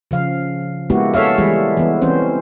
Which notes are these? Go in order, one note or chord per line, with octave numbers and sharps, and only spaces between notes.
C#3 F3 F5
G#3 A#3 B3 E4 F#4 G4
A4 C#5 E5 F5
E3 G3 G#3 E4 G#4
E3 B3
E3 C4 C#4 C5